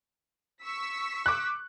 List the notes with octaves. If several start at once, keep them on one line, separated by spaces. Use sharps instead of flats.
C#6 E6 B6
D6 F#6